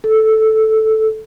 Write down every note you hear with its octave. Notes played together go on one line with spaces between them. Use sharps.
A4